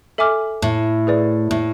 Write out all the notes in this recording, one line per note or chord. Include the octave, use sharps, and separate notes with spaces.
A4 E5 G#5 D6 F6
A2
G#4 B4 D5
A2